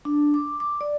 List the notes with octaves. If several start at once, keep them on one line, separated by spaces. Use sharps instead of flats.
D4
D6
D6
D5